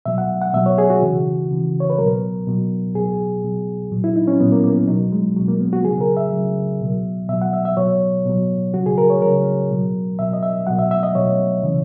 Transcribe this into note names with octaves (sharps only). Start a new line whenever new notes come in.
B2 F#3 E5
F#5
F#5
B2 F#3 E5
C#5
G#4
F#4
C#3 E3
C#3 E3
C#5
B4
B2 F#3 A#4
B2 F#3
B2 F#3 G#4
B2 F#3
A#2 F#3
E4
D#4
C#4
A#2 F#3 B3
A#3
A#3
B2 F#3 D#4
G#3
B2 F#3
A#3
B3
F#4
C#3 F#3 G#4
A#4
E5
C#3 F#3
B2 F#3
B2 F#3 E5
F#5
E5
E5
B2 F#3 C#5
B2 F#3
C#3 F#3 F#4
G#4
A#4
C#5
C#3 F#3 A#4
B2 F#3
B2 F#3 E5
D#5
E5
B2 F#3 F#5
E5
E5
D#5
B2 F#3 C#5
C#3 E3